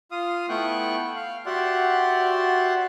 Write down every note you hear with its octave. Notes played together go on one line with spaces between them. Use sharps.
F4 F5 D#6
A3 B3 E4 G5 C#6 F#6
F5
F#4 G4 D5 E5 F#5 C6